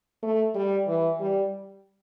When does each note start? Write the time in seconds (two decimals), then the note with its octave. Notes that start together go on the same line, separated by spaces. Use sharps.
0.23 A3
0.55 G3
0.88 E3
1.20 G3